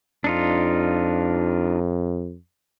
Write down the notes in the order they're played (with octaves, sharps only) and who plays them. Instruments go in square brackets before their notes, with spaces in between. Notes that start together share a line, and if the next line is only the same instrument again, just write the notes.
[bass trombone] F2 [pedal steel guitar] D4 D#4 F4